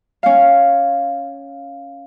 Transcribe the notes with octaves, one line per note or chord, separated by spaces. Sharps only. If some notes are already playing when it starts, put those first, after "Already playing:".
C#4 F5